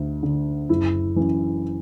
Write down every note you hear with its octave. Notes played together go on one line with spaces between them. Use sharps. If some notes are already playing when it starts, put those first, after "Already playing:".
Already playing: D2 D3
D3
F#1 E4
F#2 E3